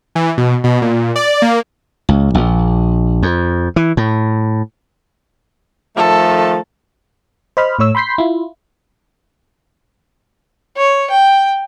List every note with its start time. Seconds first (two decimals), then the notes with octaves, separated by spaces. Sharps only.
0.15 E3
0.38 B2
0.64 B2
0.82 A#2
1.16 D5
1.42 A#3
2.09 C#2
2.35 A#1
3.23 F2
3.76 E3
3.97 A2
5.96 D#3 F3 A3 A4
7.57 C5 D#5 B5 F6
7.79 A2 A3 C#5 E6
7.95 B5 C6 G6 B6 C7
8.18 E4 F4
10.77 C#5
11.10 G5